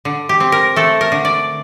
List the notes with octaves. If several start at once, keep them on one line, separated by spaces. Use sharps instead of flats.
D3
G4
C4
A#4
A3 A4
A#4
D3
D5